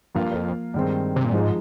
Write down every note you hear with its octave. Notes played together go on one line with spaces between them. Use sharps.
G2 F3 A#3 F4 A#4 F5
F2
G2 D#3 G#3 C4
C3
A#2
G#2 F3 G#3 D#4